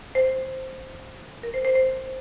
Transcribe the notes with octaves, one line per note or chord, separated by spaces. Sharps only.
C5
A#4
C5
C5
C5